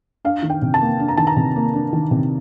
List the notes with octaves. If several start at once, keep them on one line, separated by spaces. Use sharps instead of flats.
D4 F5
D#3
G5
C3
A5
A#3
D4
A#5
D#3 A5
A#5
C3
A#3
D4
D#3
C3